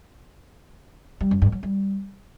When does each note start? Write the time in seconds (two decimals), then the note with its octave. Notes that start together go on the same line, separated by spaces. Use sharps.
1.21 G3
1.31 F#2
1.42 G2
1.52 F#3
1.63 G3